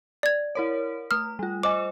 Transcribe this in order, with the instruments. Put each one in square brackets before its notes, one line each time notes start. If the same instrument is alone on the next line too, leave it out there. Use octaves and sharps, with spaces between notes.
[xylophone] D5 G#6
[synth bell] E4 A#4 C#5
[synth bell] A3 D#6 [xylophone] F6
[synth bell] G3 F4
[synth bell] C5 D#5 G#5 [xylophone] D6